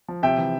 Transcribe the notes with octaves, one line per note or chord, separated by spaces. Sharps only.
F3
C3 E5 G5
E3